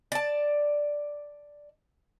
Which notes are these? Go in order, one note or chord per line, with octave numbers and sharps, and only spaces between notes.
D5 A5